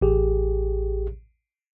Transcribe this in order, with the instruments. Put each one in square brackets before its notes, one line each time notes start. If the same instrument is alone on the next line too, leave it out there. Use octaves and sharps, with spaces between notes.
[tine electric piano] A1 G4 G#4